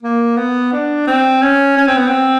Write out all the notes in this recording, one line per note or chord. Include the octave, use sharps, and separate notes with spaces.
A#3
B3
D4
C4
C#4
C#4
C4
B3
C4